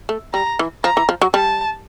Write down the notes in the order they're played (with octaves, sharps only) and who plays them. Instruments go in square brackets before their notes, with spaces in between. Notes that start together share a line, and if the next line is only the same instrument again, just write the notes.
[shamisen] A3
[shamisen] G3 [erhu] A#5
[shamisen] E3
[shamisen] F3 [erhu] A#5
[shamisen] E3
F3
F#3
[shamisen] G3 [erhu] A5